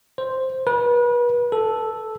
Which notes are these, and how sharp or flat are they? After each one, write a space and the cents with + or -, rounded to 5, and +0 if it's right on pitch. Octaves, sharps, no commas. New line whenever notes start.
C5 +0
B4 -35
A4 -5